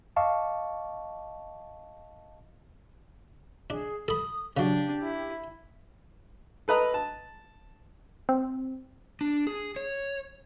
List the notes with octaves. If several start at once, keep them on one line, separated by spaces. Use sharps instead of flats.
D#5 F5 A5 C#6 D6
D4 G#4
A4 B5 D#6
C#3 F#3 D4 G4
E4
A4 B4 D#5 A#5
A5
C4
D4
G#4
C#5